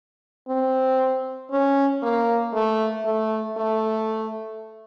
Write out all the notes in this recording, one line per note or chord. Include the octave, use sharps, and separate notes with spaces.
C4
C#4
A#3
A3
A3
A3